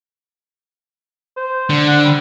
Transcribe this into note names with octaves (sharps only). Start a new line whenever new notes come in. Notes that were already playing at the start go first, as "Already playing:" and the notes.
C5
D3
F#5
G3